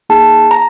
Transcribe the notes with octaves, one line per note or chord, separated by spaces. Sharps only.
A#3 D#4 G#4 A5
A#5